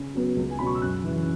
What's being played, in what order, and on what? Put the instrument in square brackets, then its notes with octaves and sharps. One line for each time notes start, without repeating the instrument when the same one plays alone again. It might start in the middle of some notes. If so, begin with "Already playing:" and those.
Already playing: [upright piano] C#3
F#3 B3
C#2
G#5
B2 F#3 C#4 B5
C#6
E6
F#2 F#6
C#3 E3